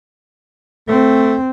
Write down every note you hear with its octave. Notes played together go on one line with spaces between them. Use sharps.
A3 C4